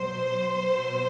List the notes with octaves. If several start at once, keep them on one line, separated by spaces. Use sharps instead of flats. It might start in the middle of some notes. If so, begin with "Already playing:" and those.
Already playing: B2 F#3 C5
B2 F#3